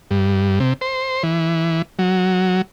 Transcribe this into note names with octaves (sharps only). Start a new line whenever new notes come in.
G2
C3
C5
E3
F#3